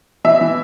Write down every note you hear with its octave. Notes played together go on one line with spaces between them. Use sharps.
E3 E5
E3